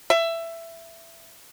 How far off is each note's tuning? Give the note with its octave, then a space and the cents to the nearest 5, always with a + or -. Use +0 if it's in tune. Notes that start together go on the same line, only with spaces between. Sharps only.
E5 +15